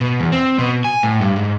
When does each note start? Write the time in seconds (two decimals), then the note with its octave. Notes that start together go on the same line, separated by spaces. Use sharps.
0.01 B2
0.20 E2
0.32 C4
0.59 B2
0.84 G#5
1.03 A2
1.21 G2
1.36 G#2